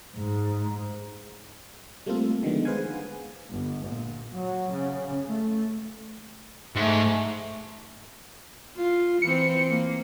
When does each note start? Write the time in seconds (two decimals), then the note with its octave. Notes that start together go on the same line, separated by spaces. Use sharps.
0.16 G#2
2.06 G3 A3 A#3 C4 F4 A4
2.43 D3 D#3 F3 G#3 B3
2.65 G#4 B4 C5 F5 F#5 G#5
3.50 G1
3.87 A#2
4.33 F#3
4.72 C#3
5.28 A3
6.76 G#2 A3
8.76 F4
9.22 E3 C4 C#7
9.69 A#3